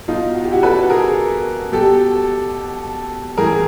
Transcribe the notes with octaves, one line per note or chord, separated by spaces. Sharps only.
B2 D#4 F4
F#4
G4
E4 F#4
A4 B4
G#4 A#4
B2 G4 A4
A2 E3 G#4 A#4